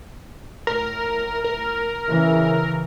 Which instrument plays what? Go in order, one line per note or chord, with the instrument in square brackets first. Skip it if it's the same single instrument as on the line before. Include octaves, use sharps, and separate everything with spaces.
[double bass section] A2 [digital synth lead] A#4
[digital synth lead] A#4
[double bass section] C#3 E3